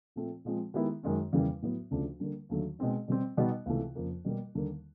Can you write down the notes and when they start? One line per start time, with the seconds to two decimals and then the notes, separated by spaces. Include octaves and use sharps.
0.16 A#2 F3 A3 C4
0.45 A#2 F3 G#3 C4
0.74 D#3 G#3 B3 E4 G4
1.03 F#2 D#3 G#3 C#4
1.33 E2 C#3 E3 G3 A#3
1.62 A2 F#3 B3
1.91 D2 C#3 F3 A3 D4
2.20 D3 G3 A#3
2.49 D#2 D3 F#3 A3
2.79 B2 G#3 C4 D#4
3.08 B2 G3 C4
3.37 B2 G3 B3 D#4 F#4
3.66 C#2 C3 E3 A3
3.95 F2 C#3 F3 A#3
4.25 B2 G3 A#3
4.55 D#2 D3 G3 A#3